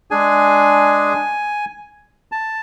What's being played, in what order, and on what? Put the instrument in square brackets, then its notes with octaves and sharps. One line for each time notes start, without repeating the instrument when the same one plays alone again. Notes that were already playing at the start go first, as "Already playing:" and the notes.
[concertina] G#3 D4 G#4 G#5
A5